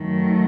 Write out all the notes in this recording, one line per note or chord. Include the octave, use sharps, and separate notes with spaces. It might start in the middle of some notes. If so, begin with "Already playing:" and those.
Already playing: F#2 D#3 F#3 A3